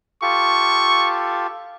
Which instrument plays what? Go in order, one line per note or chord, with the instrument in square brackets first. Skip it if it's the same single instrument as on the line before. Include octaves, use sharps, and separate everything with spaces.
[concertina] F4 G4 A4 [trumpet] C#6